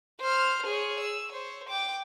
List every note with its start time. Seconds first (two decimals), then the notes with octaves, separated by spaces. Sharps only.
0.21 C5 F6
0.66 G#4 C#5
1.00 E6
1.32 C5 C#5
1.69 G5 D6